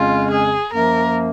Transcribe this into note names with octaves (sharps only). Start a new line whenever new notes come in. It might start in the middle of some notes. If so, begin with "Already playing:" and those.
Already playing: F2 C#3 G#3 C#4 F4
G#4
F#2 F3 A#3 A#4